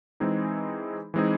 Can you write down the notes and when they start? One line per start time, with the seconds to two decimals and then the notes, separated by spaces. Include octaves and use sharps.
0.20 E3 G#3 C4 D#4 G#4
1.14 E3 G#3 C4 D#4 G#4